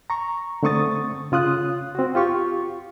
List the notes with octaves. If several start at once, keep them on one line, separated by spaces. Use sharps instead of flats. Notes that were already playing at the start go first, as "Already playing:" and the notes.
A#5 C#6
D3 A3 C4 C#6 D#6 A6
C#3 F4 D#6 F#6
C4 F#4
F4 G4 C#6